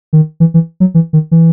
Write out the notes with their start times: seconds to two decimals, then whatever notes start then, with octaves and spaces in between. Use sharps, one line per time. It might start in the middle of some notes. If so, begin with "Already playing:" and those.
0.13 D#3
0.40 E3
0.54 E3
0.80 F#3
0.94 E3
1.13 D#3
1.31 E3